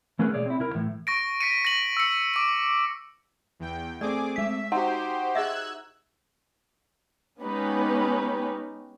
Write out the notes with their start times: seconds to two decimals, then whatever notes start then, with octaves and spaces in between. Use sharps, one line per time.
0.19 E3 A3 C#4 G#4 A#4 B4
0.34 B2 A3 G#4 C#5 D5
0.46 C4 E4
0.59 C2 E4 A#4
0.75 A2 E3
1.07 C#6 A#6 D7
1.41 A#6 B6 C#7 D#7
1.65 A#6 F#7
1.97 E6 C#7
2.34 D6 D7
3.60 E2 G5
4.01 A3 C4 G#4 D5 D6
4.36 G#3 E5 B6
4.72 D#4 F#4 G4 C5 F#5 C6
5.35 G#4 D#5 E5 E6 F#6 G#6
7.40 G#3 B3 C#4 D#4 G4 B4